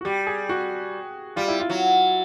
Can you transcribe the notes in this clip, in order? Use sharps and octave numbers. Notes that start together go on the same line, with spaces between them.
F#4
G3 G4
G#4
F#4
G3 F4
E4
F4
F#3